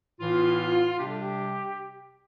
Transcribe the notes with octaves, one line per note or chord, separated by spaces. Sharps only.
A2 E3 B3 F4
C3 G3 D4 G4
A4
G4